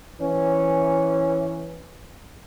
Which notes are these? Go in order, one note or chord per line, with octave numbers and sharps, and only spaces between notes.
E3 C#4